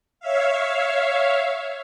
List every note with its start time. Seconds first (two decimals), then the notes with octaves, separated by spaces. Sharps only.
0.20 C#5 E5 F5